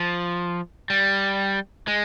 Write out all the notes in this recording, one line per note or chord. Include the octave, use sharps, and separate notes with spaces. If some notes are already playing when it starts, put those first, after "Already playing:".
Already playing: F3
G3
G#3